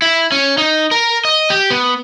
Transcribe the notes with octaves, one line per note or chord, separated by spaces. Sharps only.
E4
C#4
D#4
A#4
D#5
G4
B3